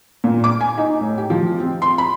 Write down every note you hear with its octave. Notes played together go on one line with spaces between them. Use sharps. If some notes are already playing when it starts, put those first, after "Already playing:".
A#2
D6
G#5
D#4
A2
G4
F3
C4
C6
B5